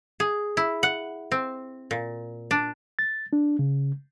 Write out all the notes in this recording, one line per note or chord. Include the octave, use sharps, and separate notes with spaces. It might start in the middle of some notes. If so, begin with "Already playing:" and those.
G#4
E4
F#5
C4
A#2
D4
A6
D4
C#3